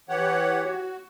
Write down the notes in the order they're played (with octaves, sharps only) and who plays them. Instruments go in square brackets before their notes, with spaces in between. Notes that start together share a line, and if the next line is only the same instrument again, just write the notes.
[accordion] E3 G4 C#5 F#5
F#4